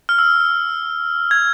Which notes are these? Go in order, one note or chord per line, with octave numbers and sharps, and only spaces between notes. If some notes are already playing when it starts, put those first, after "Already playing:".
F6
E6
G#6